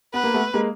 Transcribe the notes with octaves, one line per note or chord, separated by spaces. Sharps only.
B3 B4
A#3
A3 B3
G#3 A#3